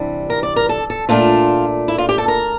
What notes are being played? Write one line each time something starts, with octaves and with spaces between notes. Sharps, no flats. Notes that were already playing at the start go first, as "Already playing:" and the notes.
Already playing: C3 E3 G3 D4
A#4
D5
A#4
A4
A4
A#2 A3 D4 F4
E4
F4
G4
A4
A#4